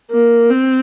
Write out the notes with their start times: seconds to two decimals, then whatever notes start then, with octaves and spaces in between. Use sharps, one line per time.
0.11 A#3
0.50 C4